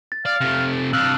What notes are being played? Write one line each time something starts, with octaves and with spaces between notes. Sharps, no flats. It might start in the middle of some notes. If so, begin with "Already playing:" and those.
A6
D5 F5
C3 A3
C3 D4 F5 E6 F#6 F#7